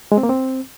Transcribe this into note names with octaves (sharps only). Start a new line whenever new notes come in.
G#3
C4
A#3
C4